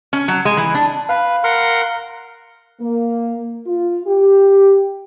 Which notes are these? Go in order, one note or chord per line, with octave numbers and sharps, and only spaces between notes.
C#4
F#3
G#3
E3
D4
B4 F5
A#4 F#5 C6
A#3
F4
G4